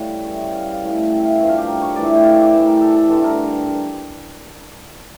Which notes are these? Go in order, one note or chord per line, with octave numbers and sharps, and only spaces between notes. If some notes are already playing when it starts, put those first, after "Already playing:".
Already playing: A2 G3 C#5 F5
C#3 E3 G3
F5
F5
A2 E3 A3
G5
E5
F5
G2 F3 A3 E5
F5
G4
A#4
C#5
A2 E3 A3 D5
E5
G5
F5
E5
D5
A2 E3 G3
A#4
A4
A4
G2 D3 A3 A4
A#4